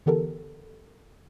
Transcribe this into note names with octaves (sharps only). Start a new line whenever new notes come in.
D3 E3 B3 G4 A4 A#4